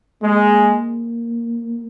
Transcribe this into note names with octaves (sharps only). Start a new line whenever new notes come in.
G#3 A#3